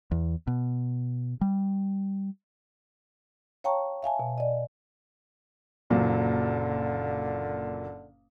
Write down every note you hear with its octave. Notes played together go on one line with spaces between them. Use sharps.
E2
B2
G3
C#5 F5 G5 A5 A#5 C#6
E5 F5 G#5 A5
B2
D5 D#5
F#1 A#2 D3 F#3